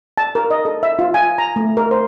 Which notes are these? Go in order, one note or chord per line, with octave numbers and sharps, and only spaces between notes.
A5
A#4
D#5
A4
E5
F4
G#5
A#5
A3
A#4
C5